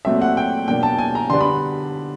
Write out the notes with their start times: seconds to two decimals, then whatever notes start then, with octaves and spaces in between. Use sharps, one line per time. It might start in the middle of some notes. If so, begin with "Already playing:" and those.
0.05 A#2 F#3 A3 C4 E5
0.22 F#5
0.37 G5
0.68 B2 F#3 A#3 D4 G5
0.83 A5
0.99 G#5
1.15 A#5
1.30 D3 G3 B3 D4 C6
1.41 B5